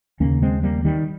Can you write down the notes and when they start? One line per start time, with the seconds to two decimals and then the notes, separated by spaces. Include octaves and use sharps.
0.20 D#2 C#3 A#3 C#4
0.42 G#3 C4
0.63 G3 A#3
0.85 D#3 G3